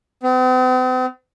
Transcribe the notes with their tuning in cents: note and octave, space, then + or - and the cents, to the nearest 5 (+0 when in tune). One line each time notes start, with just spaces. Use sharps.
C4 -45